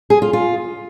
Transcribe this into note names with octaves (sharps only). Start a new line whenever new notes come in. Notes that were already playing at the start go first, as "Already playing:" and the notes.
G#4
F4
F4